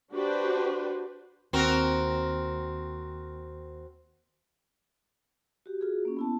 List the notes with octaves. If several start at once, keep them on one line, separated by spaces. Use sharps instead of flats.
D4 F#4 G4 B4 C5
D#2 C4 F#4 A#4
F#4 G4
F4 F#4 G#4
A#3 C#4
B3 E4 A5